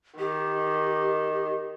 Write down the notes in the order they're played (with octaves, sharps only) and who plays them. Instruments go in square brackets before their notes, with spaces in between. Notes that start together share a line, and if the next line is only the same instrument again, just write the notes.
[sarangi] D#3 [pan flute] G4